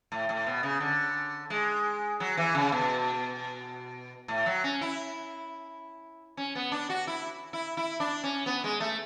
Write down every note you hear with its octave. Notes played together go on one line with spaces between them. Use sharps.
A2
A2
B2
C#3
D3
G#3
F#3
E3
C#3
B2
A2
F#3
C#4
E4
C#4
B3
D4
F#4
E4
E4
E4
D4
C#4
B3
G#3
A3